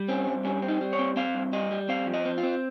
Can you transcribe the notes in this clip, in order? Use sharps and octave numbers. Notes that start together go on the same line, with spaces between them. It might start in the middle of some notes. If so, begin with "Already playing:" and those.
Already playing: G3
C4 C#4
G2
G3 C#4
C4
D#4
G3
C#5
C4
C4 F5
G2
G3 D#5
G3
C4 F5
F3
D#5
C4
F4
C4